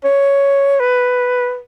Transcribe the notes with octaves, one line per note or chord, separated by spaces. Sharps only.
C#5
B4